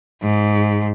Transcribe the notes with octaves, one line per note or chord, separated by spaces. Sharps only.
G#2